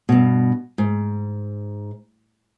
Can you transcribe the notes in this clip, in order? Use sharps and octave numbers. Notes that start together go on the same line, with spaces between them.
G2 B2
G#2